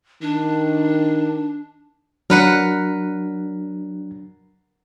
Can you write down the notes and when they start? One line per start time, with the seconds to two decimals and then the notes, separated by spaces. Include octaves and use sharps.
0.22 D#3 D4
2.30 F#3 D4 A#4 B4 F#5